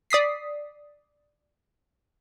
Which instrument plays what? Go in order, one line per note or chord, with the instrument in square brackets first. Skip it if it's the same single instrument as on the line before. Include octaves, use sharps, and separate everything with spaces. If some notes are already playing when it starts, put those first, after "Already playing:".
[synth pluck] D5 D#6 B6 C7